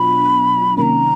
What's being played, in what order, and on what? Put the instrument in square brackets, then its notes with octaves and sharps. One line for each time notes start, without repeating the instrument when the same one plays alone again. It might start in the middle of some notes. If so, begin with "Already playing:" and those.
Already playing: [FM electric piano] B2 F#3 B3 D4 F4 [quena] B5
[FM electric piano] C3 D#3 F#3 A#3 C#4 [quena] A#5 B5